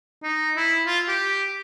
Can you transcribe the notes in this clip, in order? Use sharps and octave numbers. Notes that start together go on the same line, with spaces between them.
D#4
E4
F4
G4